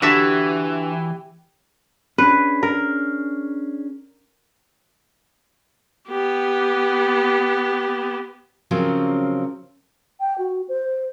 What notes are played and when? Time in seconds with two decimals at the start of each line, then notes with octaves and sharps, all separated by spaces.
0.02 D3 E3 F#4 G4 E5 A5
2.18 C#4 D4 G#4 B4
2.63 A#4
6.08 B3 G4
8.71 C#3 F3 F#3 C4 C#4 A#4
10.20 G5
10.39 F#4
10.69 C5